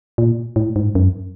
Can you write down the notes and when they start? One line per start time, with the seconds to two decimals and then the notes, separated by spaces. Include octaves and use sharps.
0.18 A#2
0.56 A2
0.76 G#2
0.95 F#2